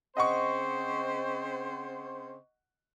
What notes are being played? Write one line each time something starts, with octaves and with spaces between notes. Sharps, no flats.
C#3 C4 C5 D#5 F#5 C#6